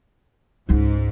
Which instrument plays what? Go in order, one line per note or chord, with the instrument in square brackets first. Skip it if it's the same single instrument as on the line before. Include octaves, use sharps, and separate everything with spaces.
[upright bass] C#2 D#4 [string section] G#2